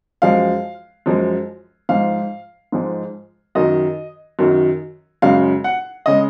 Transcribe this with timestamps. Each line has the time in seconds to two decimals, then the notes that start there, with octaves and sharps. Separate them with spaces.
0.22 F#2 F3 G#3 F5
1.06 F#2 F3 G#3
1.89 G#2 F3 G#3 F5
2.72 G#2 F3 G#3
3.55 F#2 D#3 F#3 D#5
4.39 F#2 D#3 F#3
5.22 F#2 C#3 G#3 F5
5.64 F#5
6.06 C#3 G#3 D#5